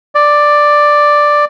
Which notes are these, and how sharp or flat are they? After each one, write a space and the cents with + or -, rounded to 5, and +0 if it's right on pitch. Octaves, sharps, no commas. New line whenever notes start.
D5 +5